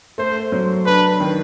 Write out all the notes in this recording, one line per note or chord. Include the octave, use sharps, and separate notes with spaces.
A3 C5
F#3
D4 B4
D#3